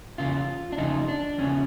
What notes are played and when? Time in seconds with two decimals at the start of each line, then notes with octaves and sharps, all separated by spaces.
0.18 E2 C#3 F4
0.72 D4
0.78 E2 C#3 F3 D#4
1.08 D4
1.38 E2 C#3 F3 C#4